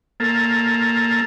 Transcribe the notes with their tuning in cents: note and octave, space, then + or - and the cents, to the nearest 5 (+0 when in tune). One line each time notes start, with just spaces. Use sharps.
A#3 +0 A4 +0